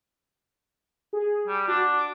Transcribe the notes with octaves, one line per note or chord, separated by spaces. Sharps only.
G#4
G3
D4 F#4
D6